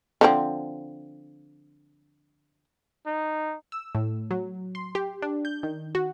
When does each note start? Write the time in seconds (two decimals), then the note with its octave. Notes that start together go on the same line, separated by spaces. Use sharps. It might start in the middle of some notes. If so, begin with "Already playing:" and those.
0.21 D3 F3 C4
3.06 D#4
3.72 E6
3.95 A2
4.31 F#3
4.75 C6
4.95 G4
5.22 D4
5.45 G6
5.63 D#3
5.95 F#4